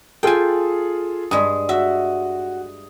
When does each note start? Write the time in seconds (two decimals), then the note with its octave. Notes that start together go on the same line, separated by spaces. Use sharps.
0.23 F4 G#4 A4 G5 G#5
1.31 G2 G#3 D#6
1.69 F#4 E5